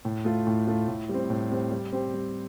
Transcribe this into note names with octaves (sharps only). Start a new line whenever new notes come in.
A2
A3 F4
A2
A3 F4
A2
G3 C4
A2
G3 C4
G3
C4 G4
G3